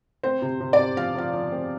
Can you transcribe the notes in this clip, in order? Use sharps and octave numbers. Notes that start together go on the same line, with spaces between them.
C4 C5
C3
C3
D5
C3
F3 F5
F3 F5
F3
C4